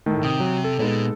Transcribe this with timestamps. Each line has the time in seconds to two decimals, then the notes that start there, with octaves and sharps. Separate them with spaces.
0.06 A2 D#3 A3
0.23 C3 G5 D#6
0.40 F#3
0.64 A4
0.79 A#2 G#3 B3 D#4